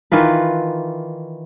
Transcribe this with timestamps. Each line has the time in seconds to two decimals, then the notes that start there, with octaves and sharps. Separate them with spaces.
0.12 D#3 E3 F4 B4